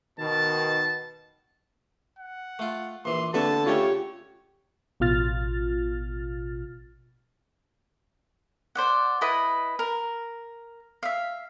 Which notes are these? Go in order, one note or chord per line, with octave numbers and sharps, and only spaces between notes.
B2 D#3 A5
F#5
A3 F4
A#1 E3 C6
D3 A#3 C4 F#4 B4 E5 A5 C#6
C#3 A3 C#4 F4 G4 C#5 G5
A1 B2 F4 F6 A6
C5 D5 F#5
E4 B4 D#5 A5
A#4
E5 F5